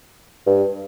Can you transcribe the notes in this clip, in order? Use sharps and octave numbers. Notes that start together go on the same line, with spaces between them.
G2